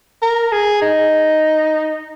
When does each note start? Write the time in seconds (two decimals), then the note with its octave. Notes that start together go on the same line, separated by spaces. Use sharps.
0.22 A#4
0.52 G#4
0.82 D#4